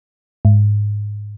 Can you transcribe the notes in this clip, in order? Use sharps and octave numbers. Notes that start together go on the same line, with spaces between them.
G#2